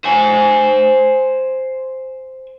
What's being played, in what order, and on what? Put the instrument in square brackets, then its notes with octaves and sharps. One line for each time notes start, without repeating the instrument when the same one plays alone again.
[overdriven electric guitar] C5 G#5